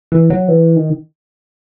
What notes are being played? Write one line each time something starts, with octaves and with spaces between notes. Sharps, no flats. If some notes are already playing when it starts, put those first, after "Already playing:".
E3
F#3
E3
D#3